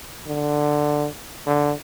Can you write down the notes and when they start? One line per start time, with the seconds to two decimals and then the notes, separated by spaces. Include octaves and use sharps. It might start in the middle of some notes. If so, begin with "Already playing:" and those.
0.26 D3
1.47 D3